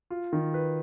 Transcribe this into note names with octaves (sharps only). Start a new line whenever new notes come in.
F4
D#3
B4